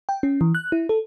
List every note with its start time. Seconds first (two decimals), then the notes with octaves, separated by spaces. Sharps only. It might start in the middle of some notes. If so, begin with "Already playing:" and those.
0.09 G5
0.23 C#4
0.41 E3
0.55 F#6
0.72 E4
0.89 A4